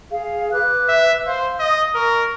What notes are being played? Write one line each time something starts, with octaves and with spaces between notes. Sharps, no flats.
G#4 F5
B4 D6 F#6
E5
C5 F5
D#5 D#6
A#4 C#6